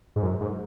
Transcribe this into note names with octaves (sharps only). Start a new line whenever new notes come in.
G#2
F#2
G#2